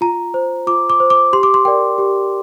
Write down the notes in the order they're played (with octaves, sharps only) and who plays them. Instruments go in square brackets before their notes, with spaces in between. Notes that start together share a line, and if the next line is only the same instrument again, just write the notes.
[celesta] F4 A#5
C5
F4 D6
D6
C5
D6
G4 C6
D6
C6
A#4 D5 G5
G4